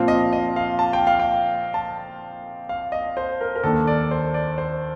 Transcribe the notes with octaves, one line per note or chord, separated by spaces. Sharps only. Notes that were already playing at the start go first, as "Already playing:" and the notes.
Already playing: A#2 F3 C4 F5
D#5
D#5
F5
A5
G5
F5
G5
A5
F5
D#5
C5
A#4
A#4
D#2 D#3 A#3 D4 A4
D5
C5
D5
C5